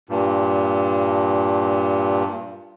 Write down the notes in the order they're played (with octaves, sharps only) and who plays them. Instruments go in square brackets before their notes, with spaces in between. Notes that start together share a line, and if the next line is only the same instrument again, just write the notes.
[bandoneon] G2 A#2